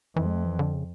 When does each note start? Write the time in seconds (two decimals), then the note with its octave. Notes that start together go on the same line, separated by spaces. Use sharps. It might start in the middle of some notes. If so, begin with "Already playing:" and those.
0.16 F2 E3
0.26 G#3
0.35 A3
0.45 E3
0.59 D3
0.74 C#3